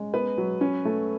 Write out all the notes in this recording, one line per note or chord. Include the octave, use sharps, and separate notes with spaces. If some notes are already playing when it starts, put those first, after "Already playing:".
Already playing: G#3 C#4
B3 B4
F#3
C#4
A3